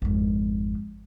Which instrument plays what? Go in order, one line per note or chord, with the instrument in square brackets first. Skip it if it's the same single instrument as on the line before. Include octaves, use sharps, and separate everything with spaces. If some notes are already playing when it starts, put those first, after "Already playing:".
[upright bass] G#1 F2